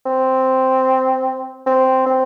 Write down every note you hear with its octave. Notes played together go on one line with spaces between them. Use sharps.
C4
C4
C4